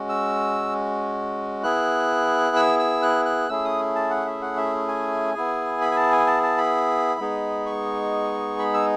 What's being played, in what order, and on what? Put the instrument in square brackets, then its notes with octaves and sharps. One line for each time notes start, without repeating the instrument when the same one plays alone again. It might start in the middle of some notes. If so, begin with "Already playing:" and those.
Already playing: [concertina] G#3 C#4 F#4
E6
B3 E4 G#4 F#6
E6
E6
F#6
F#6
A3 C#4 E4 G#4 E6
D#6
A5
F#5
E5
F#5
E5
G#5
B3 E4 G#4
B5
G#5
A5
G#5
A5
A5
B5
G#3 B3 D#4 G#4
C#6
B5
E6